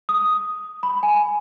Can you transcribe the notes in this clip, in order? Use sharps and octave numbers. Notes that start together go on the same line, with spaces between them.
D#6
B5
G#5